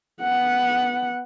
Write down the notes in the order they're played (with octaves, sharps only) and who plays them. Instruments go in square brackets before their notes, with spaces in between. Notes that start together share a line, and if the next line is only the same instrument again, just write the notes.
[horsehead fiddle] B3 F#5